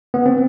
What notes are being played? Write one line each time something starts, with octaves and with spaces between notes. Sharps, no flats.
B3
C4